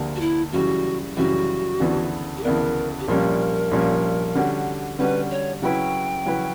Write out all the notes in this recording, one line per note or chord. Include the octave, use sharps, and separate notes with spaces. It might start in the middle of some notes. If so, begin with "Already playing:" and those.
Already playing: D2 D3 A#3 D4 G4
F#4
E4
F#2 C#3 E3 G3 F#4
F#2 C#3 E3 G3 F#4
D2 C#3 E3 B3 D4
G4
D2 C#3 E3 B3 D4 A#4
G4
A#1 A#2 G3 C#4 A#4
A#1 A#2 G3 C#4
D3 G3 C#4 F#4
D3 G3 C#4 F#4 B4
C#5
C#3 F#3 C#4 E4 B4 G5
C#3 F#3 C#4 E4 B4